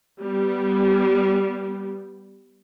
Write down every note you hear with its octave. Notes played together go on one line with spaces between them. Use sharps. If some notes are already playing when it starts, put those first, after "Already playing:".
G3 B3